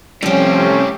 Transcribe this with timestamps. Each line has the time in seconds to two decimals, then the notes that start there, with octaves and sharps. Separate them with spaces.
0.22 A2 C3 F3 G3 A3 C4 C#4 G4